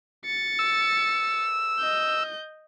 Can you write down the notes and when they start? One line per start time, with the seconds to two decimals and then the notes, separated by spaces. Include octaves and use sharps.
0.25 A6 C#7
0.59 E6
1.80 D#5 G6